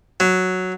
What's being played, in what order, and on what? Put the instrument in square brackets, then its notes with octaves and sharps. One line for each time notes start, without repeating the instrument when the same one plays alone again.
[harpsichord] F#3